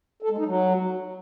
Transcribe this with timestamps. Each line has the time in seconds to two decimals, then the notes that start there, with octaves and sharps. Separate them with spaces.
0.22 A4
0.30 G#3
0.38 D#4
0.46 F#3